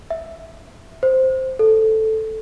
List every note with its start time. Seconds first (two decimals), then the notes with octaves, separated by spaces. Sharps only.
0.10 E5
1.03 C5
1.59 A4